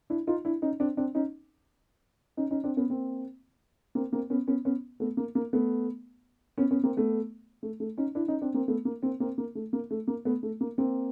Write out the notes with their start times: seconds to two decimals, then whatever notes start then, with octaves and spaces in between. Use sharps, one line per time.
0.10 D4 E4
0.27 D#4 F4
0.45 D4 E4
0.62 C#4 D#4
0.80 C4 D4
0.97 C4 D4
1.15 C#4 D#4
2.37 C#4 D#4
2.51 C#4 D#4
2.64 C4 D4
2.77 B3 C#4
2.90 A#3 C4
3.95 A#3 C4
4.13 A#3 C4
4.30 B3 C#4
4.48 B3 C#4
4.65 B3 C#4
5.00 A3 B3
5.17 A#3
5.35 A#3
5.53 A3 B3
6.58 B3 C#4
6.71 B3 C#4
6.83 A#3 C4
6.97 A3 B3
7.63 A3
7.80 A3
7.98 C#4 D#4
8.15 D4 E4
8.28 C#4 D#4
8.42 C4 D4
8.54 A#3 C4
8.68 A3 B3
8.85 A#3
9.03 A#3 C4
9.20 A#3 C4
9.38 A#3
9.55 A3
9.73 A#3
9.91 A3
10.08 A#3
10.25 A3 B3
10.43 A3
10.61 A#3
10.78 A#3 C4